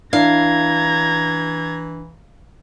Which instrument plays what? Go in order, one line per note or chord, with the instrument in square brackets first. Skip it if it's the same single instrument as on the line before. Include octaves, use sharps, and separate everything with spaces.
[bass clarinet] E3 [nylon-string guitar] D4 E4 [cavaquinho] F5 [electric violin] A#5 G#6